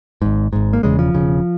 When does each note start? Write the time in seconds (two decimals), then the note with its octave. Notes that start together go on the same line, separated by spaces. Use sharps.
0.22 G#1 G#2
0.53 G#1 G#2
0.73 A#3
0.83 E1 E2 C#3 G#3
0.99 F3
1.15 E2 C#3
1.18 E1